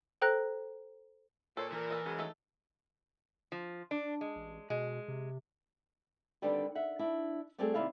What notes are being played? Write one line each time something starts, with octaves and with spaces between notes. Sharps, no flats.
A4 C5 G5 A#5 F#6 A#6
A#2 A4 C5 C#5
E3 A#4
A4 D#5
C#3 F#3 G#3
A3 D#4 A4
F3
D4
G#3
A1
B2 G#3
C3
D3 D#3 G3 B3 C4 D4
E5 F#5
D4 E4
G3 A3 C4 F#4 G#4 A4
D#2 C3 E4 D5 F5